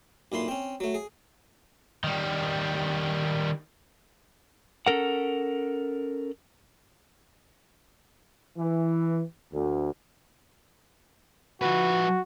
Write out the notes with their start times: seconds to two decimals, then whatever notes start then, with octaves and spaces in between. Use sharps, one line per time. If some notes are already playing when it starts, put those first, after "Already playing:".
0.32 B1 A#2 E4 C6
0.48 C4 C#4
0.80 F#3 A3
0.94 G#4
2.04 D#3 G3
4.86 C#4 A4 A#4 F#5
8.58 E3
9.53 D2
11.62 F3 F#4 B4